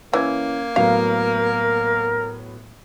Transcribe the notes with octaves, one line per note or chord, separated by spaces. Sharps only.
E3 A#3 C#4 G#6
A2 F#3 B3 A#4 F5